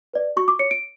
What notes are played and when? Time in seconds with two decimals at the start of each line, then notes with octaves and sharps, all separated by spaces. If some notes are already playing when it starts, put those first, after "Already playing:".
0.14 B4 D5
0.36 F#4 C#6
0.48 D6
0.59 C#5 C#7
0.71 D7